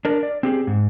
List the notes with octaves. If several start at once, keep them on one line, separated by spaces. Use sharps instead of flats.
D4 A#4 D5
D5
C4 G4 G#4
G#2